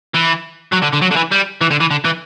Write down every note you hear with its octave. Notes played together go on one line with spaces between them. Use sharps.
E3
F#3
D3
D3
F#3
D3
E3
G3
E3
D3
E3
D3
E3